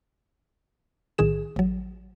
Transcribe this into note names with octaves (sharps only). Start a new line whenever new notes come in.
B1 A2 D#3 G#4 E7
A1 F#3